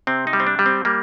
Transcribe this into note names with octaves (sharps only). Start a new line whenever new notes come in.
C3 C4
D#4
G3
C4
D4
G3
C4
G3 A#3